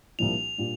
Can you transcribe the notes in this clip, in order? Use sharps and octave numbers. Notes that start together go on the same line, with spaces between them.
C2 A#2 F3 A#3 D4 F7
A#2 G3 D4 F4